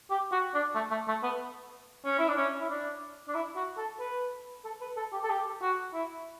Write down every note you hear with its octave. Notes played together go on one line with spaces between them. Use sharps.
G4
F#4
D4
A3
A3
A3
B3
C#4
E4
D4
C#4
E4
D4
D4
E4
F#4
A4
B4
A4
B4
A4
G4
A4
G4
F#4
E4